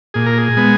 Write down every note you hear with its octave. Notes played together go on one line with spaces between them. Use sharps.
A#2 G#4
A#4
G#4
G#3 B3